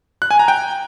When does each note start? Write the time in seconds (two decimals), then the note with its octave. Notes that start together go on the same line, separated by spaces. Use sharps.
0.22 F#6
0.31 G#5
0.39 A#5
0.48 G5